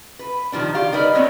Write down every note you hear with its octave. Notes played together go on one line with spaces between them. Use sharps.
B4
D#3 F3 G3 D4
D#3 G4 F5
G3 D#4 A#4 B4 C#5 D5
A3 B3 C4 B4 C#5 D#5